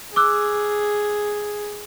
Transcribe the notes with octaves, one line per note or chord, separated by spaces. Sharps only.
G#4 D6 E6 F#6